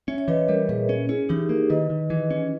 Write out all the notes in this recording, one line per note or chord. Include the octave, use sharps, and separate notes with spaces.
C#4 C#5 E5
C#5 E5
E3 B4 D#5
G3 A#4 C#5
A#2 G#4 B4
C#4
C#4 E4 G#4
E3 D#4 G4
A#3
D#3 B4 D#5
D#3
E3
C#4